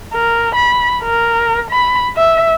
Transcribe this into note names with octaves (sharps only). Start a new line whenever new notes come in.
A#4
B5
A#4
B5
E5